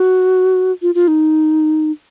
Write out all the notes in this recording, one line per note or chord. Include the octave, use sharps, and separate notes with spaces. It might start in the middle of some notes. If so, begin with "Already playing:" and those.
Already playing: F#4
F4
F4
D#4